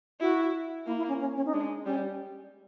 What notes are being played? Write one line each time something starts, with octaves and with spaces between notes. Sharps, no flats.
E4 F#4
A#3 E4
E4
C#4
C#4
C#4
D#4
G#3 D4
G3 C#4